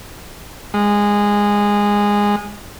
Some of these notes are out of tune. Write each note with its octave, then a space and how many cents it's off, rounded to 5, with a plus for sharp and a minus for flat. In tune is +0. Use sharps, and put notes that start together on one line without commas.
G#3 -15